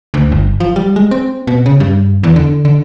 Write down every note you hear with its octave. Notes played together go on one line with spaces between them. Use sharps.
D2
G1
F3
G3
G#3
C4
B2
C#3
G2
E2
D3
D3